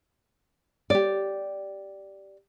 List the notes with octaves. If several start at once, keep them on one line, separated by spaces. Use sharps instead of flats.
G4 D5